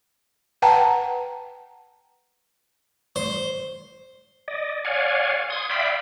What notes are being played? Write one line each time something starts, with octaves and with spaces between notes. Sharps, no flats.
B4 F#5 G5 A5 A#5
C5
D5 D#5
C#5 D5 F5 F#5 G#5
C6 D#6 G#6
D5 E5 F5 G5 B5